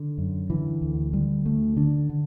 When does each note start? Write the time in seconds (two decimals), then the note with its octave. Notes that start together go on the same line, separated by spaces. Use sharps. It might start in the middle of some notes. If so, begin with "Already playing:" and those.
Already playing: D3
0.18 F#2
0.50 D3 E3
0.82 D2
1.13 D3 G3
1.45 D2 A3
1.77 D3 D4
2.09 D3